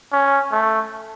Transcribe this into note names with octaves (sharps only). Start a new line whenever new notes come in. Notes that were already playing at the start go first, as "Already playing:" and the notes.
C#4
A3